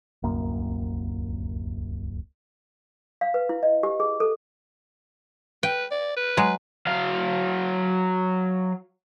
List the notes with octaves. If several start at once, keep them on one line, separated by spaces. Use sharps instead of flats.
D1 C2 F#2 A#3
F5
B4
E4
D#5
G4
G#4
A4
B4 G5
D5
B4
F#3 G#3
F#3 F5